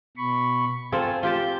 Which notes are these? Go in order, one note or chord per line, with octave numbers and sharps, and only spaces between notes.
B2 B5 C#6
C4 F4 A4 G#5
F4 G4 A5 G6